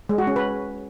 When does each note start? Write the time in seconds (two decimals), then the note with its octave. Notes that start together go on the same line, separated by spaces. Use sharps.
0.09 G#3
0.18 F#4
0.27 C#4
0.36 B4